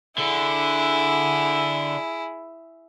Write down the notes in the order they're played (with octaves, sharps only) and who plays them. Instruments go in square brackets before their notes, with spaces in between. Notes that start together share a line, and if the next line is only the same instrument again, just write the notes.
[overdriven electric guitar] D3 [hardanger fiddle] E4 G#4